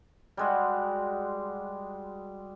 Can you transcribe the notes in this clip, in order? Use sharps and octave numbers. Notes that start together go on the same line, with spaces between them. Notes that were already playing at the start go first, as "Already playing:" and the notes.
G3 G#3 F#4